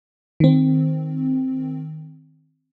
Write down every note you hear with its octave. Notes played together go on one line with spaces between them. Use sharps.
D#3 C4